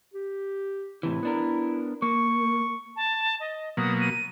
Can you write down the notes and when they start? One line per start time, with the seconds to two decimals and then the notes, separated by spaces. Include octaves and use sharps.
0.14 G4
1.03 A2 C3 E3 E4
1.23 B3 D4 A#4
2.02 A#3 C#6
2.96 A5
3.40 D#5
3.77 B2 F#3 A#3 D#6
4.01 D#7